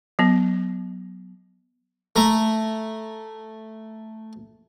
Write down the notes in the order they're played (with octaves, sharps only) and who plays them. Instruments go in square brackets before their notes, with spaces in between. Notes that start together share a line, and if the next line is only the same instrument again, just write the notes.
[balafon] F#3 B3
[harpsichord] A3 A#5